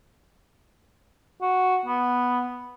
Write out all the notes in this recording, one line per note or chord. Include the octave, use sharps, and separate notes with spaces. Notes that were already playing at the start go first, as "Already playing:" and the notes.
F#4
B3